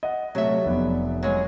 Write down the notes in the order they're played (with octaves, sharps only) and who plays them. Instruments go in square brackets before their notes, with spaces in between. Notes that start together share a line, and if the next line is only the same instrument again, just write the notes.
[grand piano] D#5 F#5
[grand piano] C3 A3 [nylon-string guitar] F#3 E5
[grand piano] F1 B3 D5
[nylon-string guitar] F#3 G#3